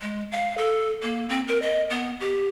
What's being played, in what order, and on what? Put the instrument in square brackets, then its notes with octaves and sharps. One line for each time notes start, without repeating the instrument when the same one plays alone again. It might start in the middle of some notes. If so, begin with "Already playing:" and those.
[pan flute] G#3
F5
A4
A#3
C4
A#4
D#5
B3
G4